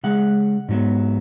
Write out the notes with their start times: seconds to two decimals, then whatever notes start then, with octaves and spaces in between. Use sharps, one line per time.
0.04 C#3 G#3 F#5
0.69 G#2 F#3 B3